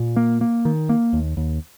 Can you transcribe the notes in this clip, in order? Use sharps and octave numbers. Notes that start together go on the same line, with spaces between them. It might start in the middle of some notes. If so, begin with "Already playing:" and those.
Already playing: A#2
A#3
A#3
D#3
A#3
D#2
D#2